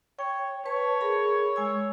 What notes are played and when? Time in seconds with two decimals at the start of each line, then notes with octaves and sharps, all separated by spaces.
0.19 C#5 G5
0.66 B4 C#5 A5
1.01 G#4 A#4 B5
1.56 G#3 G#5 E6